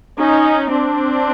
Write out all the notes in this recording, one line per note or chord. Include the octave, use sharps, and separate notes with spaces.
C#4 D#4
C4 D4